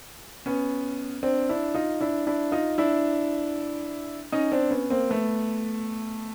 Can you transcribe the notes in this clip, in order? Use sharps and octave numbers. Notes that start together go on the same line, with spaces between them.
B3 C#4
C4 D4
D4 E4
D#4 F4
D4 E4
D4 E4
D#4 F4
D4 E4
C#4 D#4
C4 D4
B3 C#4
A#3 C4
A3 B3